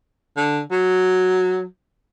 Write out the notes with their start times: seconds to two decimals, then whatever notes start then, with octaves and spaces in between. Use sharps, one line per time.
0.37 D3
0.72 F#3